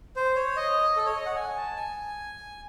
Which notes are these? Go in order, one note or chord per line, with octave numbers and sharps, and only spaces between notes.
C5
C#5
D#5
A4
C#5
D#5
F#5
G#5
A5
G#5